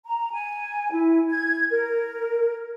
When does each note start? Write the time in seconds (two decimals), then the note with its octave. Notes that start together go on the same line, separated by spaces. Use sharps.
0.05 A#5
0.33 G#5
0.92 E4
1.30 G#6
1.70 A#4